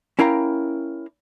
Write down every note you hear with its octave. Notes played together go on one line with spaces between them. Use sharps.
C#4 E4 A#4 F5 G5 A#5